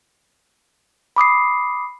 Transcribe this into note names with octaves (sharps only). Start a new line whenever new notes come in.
B5 D6 D#6 C7